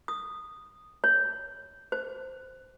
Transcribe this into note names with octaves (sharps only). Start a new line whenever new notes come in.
D#6
C#5
C5